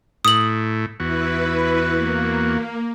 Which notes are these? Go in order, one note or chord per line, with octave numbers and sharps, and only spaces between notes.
A2 D#6 F#7
E2 E4 F#4 B4
A#3